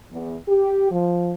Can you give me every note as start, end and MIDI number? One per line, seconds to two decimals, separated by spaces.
0.11 0.35 40
0.47 0.90 67
0.91 1.34 53